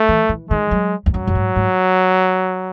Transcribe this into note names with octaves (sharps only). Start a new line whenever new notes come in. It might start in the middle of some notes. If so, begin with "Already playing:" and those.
Already playing: A3
E3
E3
D#3 G#3
F#3
E2
F#2 F#3
F#2
G#2
G#2